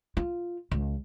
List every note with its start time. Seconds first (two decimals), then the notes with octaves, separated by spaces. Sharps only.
0.17 F4
0.71 C#2